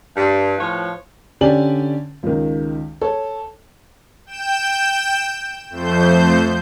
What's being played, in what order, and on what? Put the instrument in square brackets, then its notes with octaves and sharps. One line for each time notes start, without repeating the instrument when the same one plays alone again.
[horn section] G2
A2 F3 F4 B4 C#5
[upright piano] D3 C#4 G4 D5 G#5 F#7
C#2 D#3
A4 C#5
[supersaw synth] G5 G6 E7
F2 A3 C5 G6